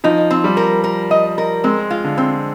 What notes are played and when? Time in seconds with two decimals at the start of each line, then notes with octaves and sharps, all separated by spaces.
0.04 F3 D#4
0.31 C4
0.44 G3
0.57 A#4
0.84 A#4
1.11 D#5
1.38 A#4
1.64 G#3 C4
1.91 F4
2.04 D3
2.18 C4